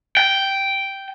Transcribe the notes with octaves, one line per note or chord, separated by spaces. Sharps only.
G5